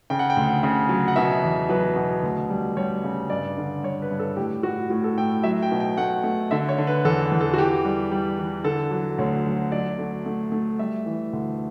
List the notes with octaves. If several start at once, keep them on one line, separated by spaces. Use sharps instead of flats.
C#3 G5
F#5
G5
D2
C#3
F#3
F#5
B2 E5
E2
F#3 B4
B2
D2
G3
G3 C#5
C#3
G2 D5
D3
G2 C#5
B4
G2
A4
A2 G4
A2 F#4
A2 F#4
A4
A2 G5
F#3 E5
G5
B2
G5
A3 F#5
A3
D3 E5
C#5
D3
B4
E2 A4
E2
A4
F#4
E3 G4
G3
G3
E3
D3 A4
F#3
D2 C#5
F#3
F#3 D5
A3
A3
A3
G3 E5
E3
D2